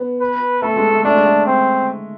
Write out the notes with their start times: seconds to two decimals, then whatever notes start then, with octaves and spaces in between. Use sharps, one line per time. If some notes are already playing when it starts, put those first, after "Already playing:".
Already playing: B3
0.20 B4
0.62 A3 A4
0.76 G#3
0.90 A3
1.04 A3 D4
1.15 G#3
1.26 A3
1.46 C4